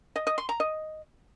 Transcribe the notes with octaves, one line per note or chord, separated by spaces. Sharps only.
D#5
D#5
C6
A#5
D#5